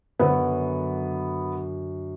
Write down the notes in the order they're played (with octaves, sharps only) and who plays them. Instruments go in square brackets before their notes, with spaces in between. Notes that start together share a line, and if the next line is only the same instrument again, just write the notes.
[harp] F#2 D3 [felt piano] B3